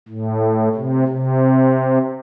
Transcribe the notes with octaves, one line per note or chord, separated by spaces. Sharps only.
A2
C3
C3